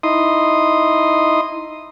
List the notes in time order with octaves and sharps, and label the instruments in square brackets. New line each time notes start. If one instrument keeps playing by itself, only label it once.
[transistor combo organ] D#4 E4 C6 D#6